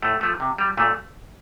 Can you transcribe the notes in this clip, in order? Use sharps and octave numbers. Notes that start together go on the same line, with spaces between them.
A2 A3
F3 A3
C3
G3
A#2 A3